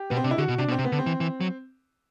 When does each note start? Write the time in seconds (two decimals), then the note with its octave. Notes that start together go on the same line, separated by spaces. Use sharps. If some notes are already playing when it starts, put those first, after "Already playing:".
Already playing: G4
0.10 B2 B3
0.17 C4
0.24 C3 D4
0.31 E4
0.38 D3 F#4
0.48 B2
0.58 C3 D4
0.68 B2
0.72 C4
0.79 C3
0.85 B3
0.92 D3
0.99 C4
1.06 E3
1.20 E3
1.41 F#3